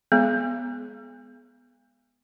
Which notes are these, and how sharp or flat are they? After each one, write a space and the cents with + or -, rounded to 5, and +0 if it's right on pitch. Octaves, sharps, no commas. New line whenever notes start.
G#3 +0 B3 +0 G#4 +30